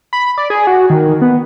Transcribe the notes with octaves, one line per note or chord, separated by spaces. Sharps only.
B5
D5
G#4
F#4
D#3
B3